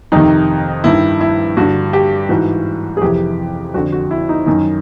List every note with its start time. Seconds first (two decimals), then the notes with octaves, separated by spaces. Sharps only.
0.12 F2 C3 D#3 D#4
0.84 G2 D#3 E4
1.21 E4
1.57 G2 D3 F#4
1.93 G4
2.29 G#2 E3 F#4
2.97 G#4
3.02 F2 C3 E3 G4
3.74 F2 F#4
3.77 D3
3.92 F#4
4.11 E4
4.29 D#4
4.46 F#2 D#3 D#4